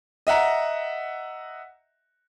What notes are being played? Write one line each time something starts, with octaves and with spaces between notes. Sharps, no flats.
D#5 E5 F#5 A#5